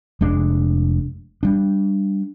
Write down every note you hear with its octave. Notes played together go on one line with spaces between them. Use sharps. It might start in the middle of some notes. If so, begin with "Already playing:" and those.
F1 G#3 D4
G3 D4